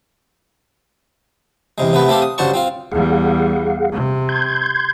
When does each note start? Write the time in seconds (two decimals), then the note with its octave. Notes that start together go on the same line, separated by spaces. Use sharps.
1.78 E2 C3 G#3
1.93 C3 A3 B3 B4
2.08 A3 C4 G4 A4 F5
2.22 D#6
2.38 G2 C#3 F#4 C5 A5 C#6
2.54 C4 F4 F5
2.92 E2 G3 G#4 F5 F#5
3.92 C3
4.29 C6 G6 G#6